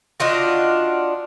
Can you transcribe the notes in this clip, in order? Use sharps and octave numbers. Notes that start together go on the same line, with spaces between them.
D4 D#4 F4 F#4